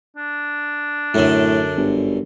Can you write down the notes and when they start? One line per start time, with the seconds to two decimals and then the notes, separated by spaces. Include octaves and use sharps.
0.17 D4
1.14 F#2 A2 D3
1.77 G1